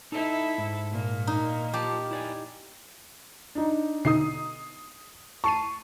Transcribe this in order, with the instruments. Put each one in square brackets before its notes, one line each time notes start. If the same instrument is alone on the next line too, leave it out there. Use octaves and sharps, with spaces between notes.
[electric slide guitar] D#4 D#5 [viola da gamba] E4 A4
[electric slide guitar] G#2
[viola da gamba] A#2 A#3
[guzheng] D#4
[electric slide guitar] F4 A5 [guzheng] G4
[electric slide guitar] E4 D5 G#5
[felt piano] D4 D#4
[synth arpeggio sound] B2 D3 D#4 [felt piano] D#6 C7
[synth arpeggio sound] A5 C7 D#7 [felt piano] C#6